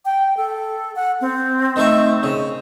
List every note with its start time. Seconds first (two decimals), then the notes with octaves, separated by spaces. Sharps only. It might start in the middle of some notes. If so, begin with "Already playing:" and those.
0.05 G5
0.37 A4
0.96 F#5
1.21 C4
1.76 D#3 A3 E5
2.23 C#3